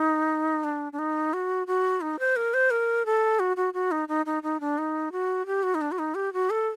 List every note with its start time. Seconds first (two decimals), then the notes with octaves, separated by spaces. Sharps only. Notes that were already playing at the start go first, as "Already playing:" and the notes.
Already playing: D#4
0.64 D4
0.93 D4
0.99 D#4
1.33 F#4
1.67 F#4
2.01 D#4
2.19 C5
2.36 A#4
2.54 C5
2.71 A#4
3.06 A4
3.39 F#4
3.57 F#4
3.74 F#4
3.91 D#4
4.08 D#4
4.26 D#4
4.43 D#4
4.60 D4
4.78 D#4
5.12 F#4
5.46 G4
5.63 F#4
5.75 D#4
5.81 D4
5.92 F#4
5.99 D#4
6.15 G4
6.33 F#4
6.50 A4